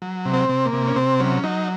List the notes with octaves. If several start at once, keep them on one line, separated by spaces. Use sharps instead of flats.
F#3
C3
C4
C3
A#3
C3
C#4
C3 C4
F#3 C#4
F#3 D#4